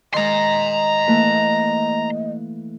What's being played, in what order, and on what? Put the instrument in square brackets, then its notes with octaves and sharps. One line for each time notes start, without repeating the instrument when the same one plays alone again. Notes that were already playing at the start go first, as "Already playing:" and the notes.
[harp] D#3 G#3 [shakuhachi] D#5 [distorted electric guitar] A#5 C6
[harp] E3 A3 A#3